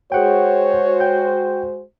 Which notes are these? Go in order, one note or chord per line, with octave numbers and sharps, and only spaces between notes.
G#3 F#4 G#4 C5 C#5 F#5 G5
G5 G6